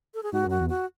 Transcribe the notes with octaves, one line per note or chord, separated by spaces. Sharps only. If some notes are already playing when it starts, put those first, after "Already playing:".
A4
G#4
G#2 F#4
F#2 F#4
E2
F#4